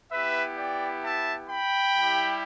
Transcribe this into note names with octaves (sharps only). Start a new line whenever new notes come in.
B3 E4 G4 B4 E5
D5 G5
E5 A5
G5 B5
G3 E4 G4